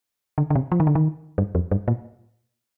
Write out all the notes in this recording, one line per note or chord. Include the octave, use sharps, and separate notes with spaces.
D3
D3
C3
F3
D#3
D3
D#3
G2
F2
G2
A#2